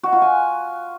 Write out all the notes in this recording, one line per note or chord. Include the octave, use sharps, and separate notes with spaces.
F#4
F4
G#5